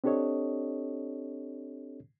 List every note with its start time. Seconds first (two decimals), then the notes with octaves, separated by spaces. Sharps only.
0.04 C4 D4 G4 A4 C#5 D#5